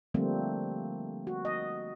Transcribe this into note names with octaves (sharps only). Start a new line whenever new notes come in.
D3 F3 G3 A3 A#3 C4
F#4
D#5